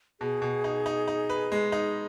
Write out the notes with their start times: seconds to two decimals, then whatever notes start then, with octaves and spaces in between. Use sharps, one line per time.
0.21 B2 G#4
0.42 B2
0.64 D#4
0.86 D#4
1.08 D#4
1.29 B4
1.52 G#3
1.72 D#4